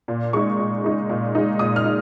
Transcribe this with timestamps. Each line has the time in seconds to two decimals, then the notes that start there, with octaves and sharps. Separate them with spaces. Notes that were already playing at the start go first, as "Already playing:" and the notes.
0.08 A#2
0.33 G#3 D#4 C#6
0.59 A#2
0.84 G#3 D#4
1.09 A#2
1.35 G#3 D#4
1.59 A#2 D#6
1.76 F6
1.85 D#4